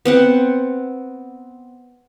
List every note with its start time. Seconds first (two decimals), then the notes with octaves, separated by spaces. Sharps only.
0.05 B3 C4 F#5